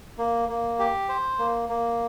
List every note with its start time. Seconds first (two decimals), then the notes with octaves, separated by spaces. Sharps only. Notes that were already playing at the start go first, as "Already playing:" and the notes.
0.18 A#3
0.49 A#3
0.79 G4
1.09 C5
1.39 A#3
1.69 A#3